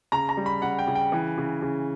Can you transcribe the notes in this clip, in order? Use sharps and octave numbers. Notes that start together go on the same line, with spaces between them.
C#3 A#5
A#5
G3
B5
C#3 F#5
G5
C#3
G5
E3
C#3
C#3